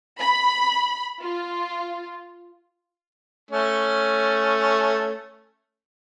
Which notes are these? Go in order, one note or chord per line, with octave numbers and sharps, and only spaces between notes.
B5
F4
A3 C#4